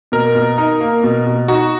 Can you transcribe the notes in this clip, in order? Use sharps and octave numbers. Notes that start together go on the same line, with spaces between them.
B2 A#4
B2
D#4
A#3
B2
B2
D#4 F#4